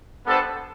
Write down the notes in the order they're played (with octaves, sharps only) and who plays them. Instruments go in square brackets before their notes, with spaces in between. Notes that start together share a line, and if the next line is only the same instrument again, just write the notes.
[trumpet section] G3 B3 D4 A4 C5